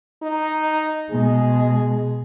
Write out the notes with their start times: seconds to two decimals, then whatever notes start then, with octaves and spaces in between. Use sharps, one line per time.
0.22 D#4
1.11 B2 G#3 G#4